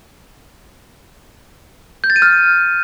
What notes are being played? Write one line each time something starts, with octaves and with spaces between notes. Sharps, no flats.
G6
A6
D#7
F6